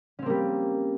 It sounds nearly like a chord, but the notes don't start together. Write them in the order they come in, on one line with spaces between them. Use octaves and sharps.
C#4 C4 A#3 G3